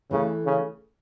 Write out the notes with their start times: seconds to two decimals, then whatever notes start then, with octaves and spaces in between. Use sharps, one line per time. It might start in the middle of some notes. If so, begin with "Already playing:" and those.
0.11 C#3 E3 A3 E4 A4
0.46 C#3